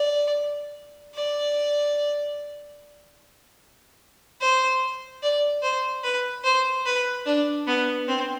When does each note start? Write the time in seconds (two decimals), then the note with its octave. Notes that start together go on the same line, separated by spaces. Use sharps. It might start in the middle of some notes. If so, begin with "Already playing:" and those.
Already playing: D5
1.15 D5
4.41 C5
5.22 D5
5.63 C5
6.04 B4
6.44 C5
6.85 B4
7.26 D4
7.67 B3
8.08 C4